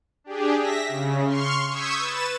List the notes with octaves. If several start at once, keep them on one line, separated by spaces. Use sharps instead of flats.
D4 G4 G#4
E5 A#6 B6
C#3
C6 C#6 F6
C#6 D#6 E6 G6 G#6 B6
B4 A6 E7